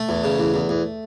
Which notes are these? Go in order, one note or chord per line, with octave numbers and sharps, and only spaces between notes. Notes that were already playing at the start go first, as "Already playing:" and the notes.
Already playing: A3
E2
C#3
E2
E2
E2